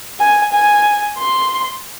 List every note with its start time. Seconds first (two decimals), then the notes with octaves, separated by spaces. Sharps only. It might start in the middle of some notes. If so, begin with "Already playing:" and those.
0.20 G#5
0.52 G#5
1.18 C6